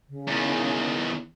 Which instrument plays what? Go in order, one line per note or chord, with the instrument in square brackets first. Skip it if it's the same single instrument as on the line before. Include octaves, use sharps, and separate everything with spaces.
[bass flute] C#3
[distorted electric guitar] E2 D#3